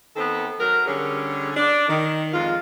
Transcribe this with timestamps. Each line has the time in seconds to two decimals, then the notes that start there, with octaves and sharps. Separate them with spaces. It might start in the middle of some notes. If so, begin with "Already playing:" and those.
0.16 D#3 B3 C4 A4
0.60 F#3 A#4
0.86 D3 G3 C#4 G#4
1.56 D4
1.88 D#3
2.33 F2 G#3 F4